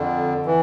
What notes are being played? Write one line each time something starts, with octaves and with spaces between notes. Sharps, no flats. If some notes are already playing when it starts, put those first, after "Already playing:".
Already playing: F2 D3
E3